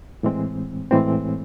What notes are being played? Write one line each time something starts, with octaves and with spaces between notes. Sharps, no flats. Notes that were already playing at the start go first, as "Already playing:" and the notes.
A2 E3 G#3 C4
A2 E3 G#3 C4